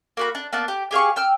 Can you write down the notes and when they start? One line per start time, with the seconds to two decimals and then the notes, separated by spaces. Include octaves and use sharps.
0.17 A#3 F#4 B5
0.35 D4
0.53 A#3 B3 D4 A5
0.68 G4
0.91 G4 G#4 F5 C#6
1.16 G5 E6 F6